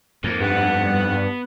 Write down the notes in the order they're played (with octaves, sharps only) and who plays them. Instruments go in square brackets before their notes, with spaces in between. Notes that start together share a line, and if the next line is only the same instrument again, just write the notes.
[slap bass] F2 G#2 [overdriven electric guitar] A#3
[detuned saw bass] G2 [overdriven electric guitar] B3 [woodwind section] F#5